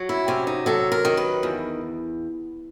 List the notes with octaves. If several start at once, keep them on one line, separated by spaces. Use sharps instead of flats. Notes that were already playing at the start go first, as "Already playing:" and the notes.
Already playing: F#3
E4
C3 C#4
D#4
F#3 A4
A#4
D#3
B4
E2